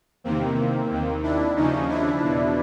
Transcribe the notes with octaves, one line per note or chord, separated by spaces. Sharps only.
E2 C3 D#3 A#3 C4
D#2 D#3
D4 E4
D#2 C#3 F3 C#4 D#4
D4 E4
E2 B2